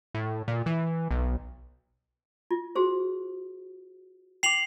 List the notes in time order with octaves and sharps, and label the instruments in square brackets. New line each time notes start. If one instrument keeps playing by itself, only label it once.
[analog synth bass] A2
A#2
E3
B1
[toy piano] F4
F#4 G#4 C5
[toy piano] G5 D6 [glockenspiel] C7 F7 F#7